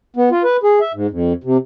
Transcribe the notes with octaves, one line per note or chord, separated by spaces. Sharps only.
B3
F4
B4
G#4
E5
G#2
F2
C3